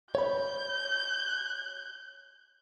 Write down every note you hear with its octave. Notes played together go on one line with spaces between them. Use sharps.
C#5 B5 G6